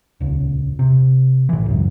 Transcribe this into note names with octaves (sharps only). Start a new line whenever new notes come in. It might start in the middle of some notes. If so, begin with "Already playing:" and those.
D#1 C#2
C3
A2 E3
C#2 F#2